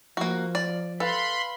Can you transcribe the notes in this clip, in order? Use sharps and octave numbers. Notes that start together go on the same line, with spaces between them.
F3 A#3 F#4
D5
A4 B4 F5 B5 C6